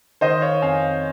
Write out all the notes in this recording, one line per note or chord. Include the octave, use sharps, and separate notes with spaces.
D#3 C5 D#5
C#5 F5
F2 F5 G#5